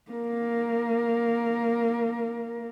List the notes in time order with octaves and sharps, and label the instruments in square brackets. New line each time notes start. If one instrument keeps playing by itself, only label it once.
[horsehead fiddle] A#3 A#4